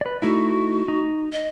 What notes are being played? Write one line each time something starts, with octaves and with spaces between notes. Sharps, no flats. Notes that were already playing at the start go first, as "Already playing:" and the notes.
B4 D5
A3 D#4 E4 F#4
D#4
D#5